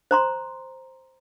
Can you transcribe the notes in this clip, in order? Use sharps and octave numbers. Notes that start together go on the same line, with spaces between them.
C5 A#5 C6